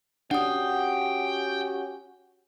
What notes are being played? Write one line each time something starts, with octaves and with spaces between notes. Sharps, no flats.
C#4 D4 F#4 G4 F#5 G5 D#6